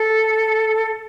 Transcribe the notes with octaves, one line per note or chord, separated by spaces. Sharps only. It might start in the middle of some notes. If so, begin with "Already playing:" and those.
Already playing: A4